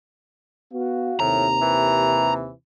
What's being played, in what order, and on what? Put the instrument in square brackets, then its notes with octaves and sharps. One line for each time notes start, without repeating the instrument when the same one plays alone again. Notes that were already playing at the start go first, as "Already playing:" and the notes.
[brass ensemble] B3 F#4 F5
[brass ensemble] D#2 C3 [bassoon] A2 [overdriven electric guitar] A#5
[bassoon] E3